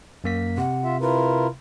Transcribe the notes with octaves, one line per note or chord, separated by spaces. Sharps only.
F#2 A#3 B6
C3 F#5
F4 E5
E4 F4 A#4 B4